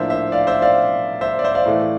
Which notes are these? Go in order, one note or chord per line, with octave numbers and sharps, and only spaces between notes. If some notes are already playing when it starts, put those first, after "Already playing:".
Already playing: A2 F3 A#3 D4 C5 E5
C5 E5
D5 F5
C5 E5
D5 F5
C5 E5
D5
C5 E5
D5 F5
A2 E3 A3